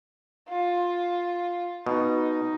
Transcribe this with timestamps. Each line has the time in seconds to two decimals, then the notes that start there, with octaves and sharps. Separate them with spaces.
0.49 F4
1.86 B2 D#4